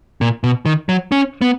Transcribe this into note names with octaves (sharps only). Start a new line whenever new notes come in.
A#2
B2
D#3
F#3
C#4
B3